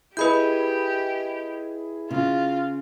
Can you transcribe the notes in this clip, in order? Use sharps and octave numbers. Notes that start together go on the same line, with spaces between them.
E4 G4 G#4 B4 D#5 B5 G6
C#3 F4